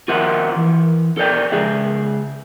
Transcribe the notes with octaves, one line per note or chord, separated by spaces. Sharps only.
F4 F#4 A#4 C5 E5 F#5
E3
A4 A#4 D5 G5
C#2 G#4 E5